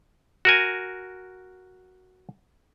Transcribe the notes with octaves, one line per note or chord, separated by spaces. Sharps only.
F#4 A#4 G#5